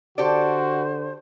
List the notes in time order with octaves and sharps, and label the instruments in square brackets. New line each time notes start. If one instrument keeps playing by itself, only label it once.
[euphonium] D3 [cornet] F#4 [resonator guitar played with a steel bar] G4 A4 D5 [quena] C5